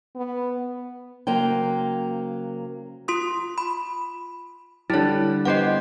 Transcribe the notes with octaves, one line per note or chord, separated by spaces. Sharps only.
B3
C#3 F#3 A#3 C5 G5
F4 C6 D#6
B5
D3 G3 E4 C#5
B3 G4 C5 D#5 F#5